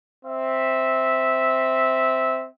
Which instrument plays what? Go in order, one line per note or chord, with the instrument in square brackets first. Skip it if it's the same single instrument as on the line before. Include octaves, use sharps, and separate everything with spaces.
[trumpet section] C4 E5